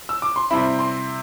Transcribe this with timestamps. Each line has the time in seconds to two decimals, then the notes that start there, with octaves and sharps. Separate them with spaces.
0.09 E6
0.22 D6
0.36 C6
0.50 C3 G3 C4 E4 B5
0.79 C6